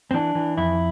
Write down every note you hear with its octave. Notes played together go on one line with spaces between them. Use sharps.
C4
E3 D4
E3
F2 E4